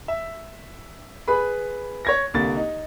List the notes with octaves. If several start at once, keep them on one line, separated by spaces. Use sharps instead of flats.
E5
G#4 B4 B5
C#5 G#6 A#6
C2 D3 A#3 A6
D#4